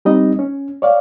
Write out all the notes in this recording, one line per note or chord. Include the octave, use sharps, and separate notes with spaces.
G3 C4 D#4 D#5
C#4
C#5 D5 F5